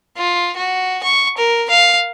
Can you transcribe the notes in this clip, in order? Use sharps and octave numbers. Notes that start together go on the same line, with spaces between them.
F4
F#4
C#6
A#4
F5